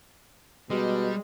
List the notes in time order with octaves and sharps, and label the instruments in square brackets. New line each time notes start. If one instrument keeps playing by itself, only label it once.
[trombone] B2 [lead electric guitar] G3 [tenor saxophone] G#3